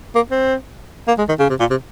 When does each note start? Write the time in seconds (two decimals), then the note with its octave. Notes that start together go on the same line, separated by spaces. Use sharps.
0.15 A#3
0.31 C4
1.08 A#3
1.18 G#3
1.29 D#3
1.39 C#3
1.49 C3
1.60 A#2
1.70 C3